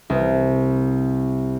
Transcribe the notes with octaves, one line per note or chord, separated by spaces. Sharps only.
C2